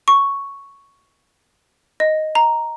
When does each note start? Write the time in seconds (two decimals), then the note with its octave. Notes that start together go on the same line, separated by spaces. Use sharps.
0.08 C#6
2.00 D#5
2.35 A#5